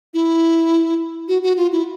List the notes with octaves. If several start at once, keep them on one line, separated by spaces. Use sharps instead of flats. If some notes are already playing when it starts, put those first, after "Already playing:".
E4
F#4
F#4
F4
E4